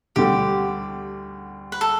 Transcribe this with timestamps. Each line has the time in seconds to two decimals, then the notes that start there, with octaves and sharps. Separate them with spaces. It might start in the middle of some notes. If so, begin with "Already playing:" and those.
0.16 D2 D3 G3 G4
1.72 B4
1.81 A4